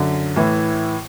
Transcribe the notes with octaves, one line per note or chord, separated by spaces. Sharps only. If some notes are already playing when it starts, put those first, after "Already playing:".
Already playing: F#2 D3
A2 E3